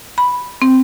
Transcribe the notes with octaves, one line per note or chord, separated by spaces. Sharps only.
B5
C4